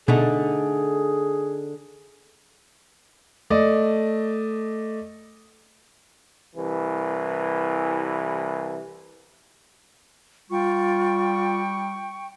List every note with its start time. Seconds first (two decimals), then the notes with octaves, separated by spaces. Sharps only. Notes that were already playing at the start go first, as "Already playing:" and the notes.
0.08 B2 D3 A3 D#4 G#4
3.50 A3 D5 D#5
6.55 C2 E3
10.50 G3 F4 G5 C#6